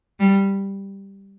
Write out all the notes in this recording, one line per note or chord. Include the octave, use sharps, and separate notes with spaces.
G3